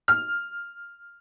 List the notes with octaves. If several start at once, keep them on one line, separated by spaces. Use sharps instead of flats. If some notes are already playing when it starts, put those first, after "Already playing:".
F6